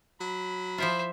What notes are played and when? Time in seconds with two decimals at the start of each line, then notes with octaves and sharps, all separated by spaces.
0.21 F#3 B5
0.78 F3 E4 F4 C5 E5